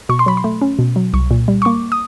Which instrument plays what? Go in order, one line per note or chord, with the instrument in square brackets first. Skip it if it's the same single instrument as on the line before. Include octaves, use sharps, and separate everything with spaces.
[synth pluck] B2 C#6
C6
F#3 B5
C6
A3
C#4
B2
F#3
C2 C#6
A#2
G3
C#6
A#3 D6
D#6